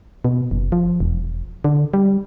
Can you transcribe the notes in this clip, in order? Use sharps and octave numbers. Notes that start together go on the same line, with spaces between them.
B2
F#1
F3
E1
D3
G3